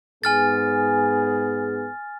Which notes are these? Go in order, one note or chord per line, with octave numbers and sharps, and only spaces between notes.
G#2 B3 G#4 G#5 F6 A6